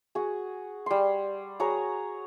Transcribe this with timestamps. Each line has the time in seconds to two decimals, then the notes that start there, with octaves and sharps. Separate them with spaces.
0.15 F#4 G#4
0.86 G3 C6
1.60 F#4 G#4 C#5 A#5